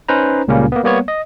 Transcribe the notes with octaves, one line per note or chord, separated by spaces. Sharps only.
C#4 D#4 B4 C5 A#5
C#2 A#2 C#3 G3 A#3 C#4
A#3 B3
G3 A#3 B3 C#5
D#5